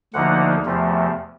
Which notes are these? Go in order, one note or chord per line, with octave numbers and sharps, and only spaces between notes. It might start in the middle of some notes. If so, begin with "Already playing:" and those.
D2 D3 F3 A#3 D#4 F#5
E2 C3 F3 A3